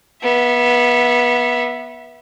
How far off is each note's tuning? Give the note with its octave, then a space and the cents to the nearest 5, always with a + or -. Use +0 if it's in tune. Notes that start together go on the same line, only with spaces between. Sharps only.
B3 -25 E5 +0